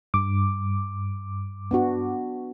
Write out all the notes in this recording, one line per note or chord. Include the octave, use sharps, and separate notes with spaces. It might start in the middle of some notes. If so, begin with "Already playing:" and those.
G2 D6
B3 D4 F#4